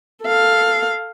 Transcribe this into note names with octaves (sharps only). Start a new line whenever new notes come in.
A4 F5